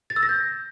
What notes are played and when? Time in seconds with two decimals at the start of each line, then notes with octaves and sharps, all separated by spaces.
0.10 A6
0.16 E6
0.23 A#6
0.29 G6